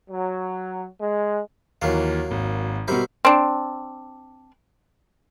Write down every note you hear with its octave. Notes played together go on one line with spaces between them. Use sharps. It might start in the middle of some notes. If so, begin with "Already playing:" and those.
F#3
G#3
D#2 E3 F#3 A#3 F5
G#1
B2 G3 A#4 C5 E5
C4 D4